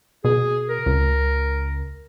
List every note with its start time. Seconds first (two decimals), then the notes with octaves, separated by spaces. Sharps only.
0.24 B2 G#4
0.69 A#4
0.86 C#2